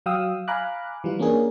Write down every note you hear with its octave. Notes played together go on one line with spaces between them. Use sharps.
F#3 F5 G5 D#6 E6
F5 G#5 A#5 B5 D6 F#6
E3 G3 F4
A#3 C#4 D4 G#4 A#4